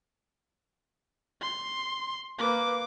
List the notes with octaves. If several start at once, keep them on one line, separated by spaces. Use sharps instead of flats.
C6
A#3 B4 D6